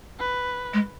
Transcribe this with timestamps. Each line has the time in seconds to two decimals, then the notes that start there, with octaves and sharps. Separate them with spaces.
0.19 B4
0.73 G#3